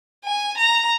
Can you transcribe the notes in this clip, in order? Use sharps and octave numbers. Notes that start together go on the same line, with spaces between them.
G#5
A#5